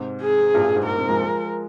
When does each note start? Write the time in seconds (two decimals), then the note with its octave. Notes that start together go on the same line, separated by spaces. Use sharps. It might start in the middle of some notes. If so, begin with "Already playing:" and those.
Already playing: G#2 C3
0.21 G#4
0.54 G2 A#2
0.64 G2 A#2
0.76 G#2
0.86 A#4
0.97 G#2 C3
1.09 F3 G#3